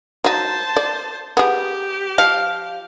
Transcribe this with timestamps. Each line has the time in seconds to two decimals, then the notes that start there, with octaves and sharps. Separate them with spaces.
0.24 F#3 D#4 C5 A5
0.76 D5
1.37 B3 G4 G#4
2.18 F3 F5